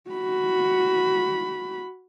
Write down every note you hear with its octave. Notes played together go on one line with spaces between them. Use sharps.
F#4 B5